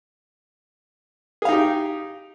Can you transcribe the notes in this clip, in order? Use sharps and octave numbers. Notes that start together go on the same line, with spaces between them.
D#4 G4 G#4 F5